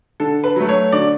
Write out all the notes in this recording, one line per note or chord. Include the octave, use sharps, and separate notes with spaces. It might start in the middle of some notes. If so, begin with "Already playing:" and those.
D3 A4
B4
F#3 A3
C#5
D3 D5